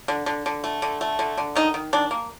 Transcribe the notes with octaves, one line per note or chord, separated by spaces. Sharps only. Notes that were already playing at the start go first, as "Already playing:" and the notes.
D3
D3
D3
A3
D3
A3
D3
D3
D#3 D#4
D#3
D#3 D4
A#3